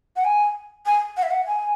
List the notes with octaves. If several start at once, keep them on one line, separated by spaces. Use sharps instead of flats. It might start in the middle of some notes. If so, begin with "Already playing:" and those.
F#5
G#5
G#5
F#5
E5
F#5
G#5